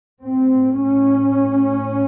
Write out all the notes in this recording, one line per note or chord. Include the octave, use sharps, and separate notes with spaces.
A2 C4
C#4